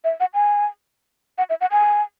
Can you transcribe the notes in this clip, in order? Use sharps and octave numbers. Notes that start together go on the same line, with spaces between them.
E5
F#5
G#5
F#5
E5
F#5
G#5